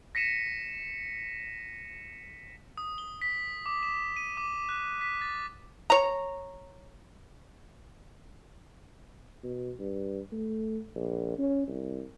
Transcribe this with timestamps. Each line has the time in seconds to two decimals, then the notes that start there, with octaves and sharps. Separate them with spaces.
0.15 A#6 B6 C#7 D#7 E7
2.78 D#6
2.98 G7
3.22 B6
3.66 D6
3.83 E7
4.16 D#7
4.37 D6
4.69 F#6
5.01 B6
5.21 A6
5.90 C#5 A#5
9.43 B2
9.79 G2
10.32 A3
10.95 A#1
11.39 C#4
11.67 C2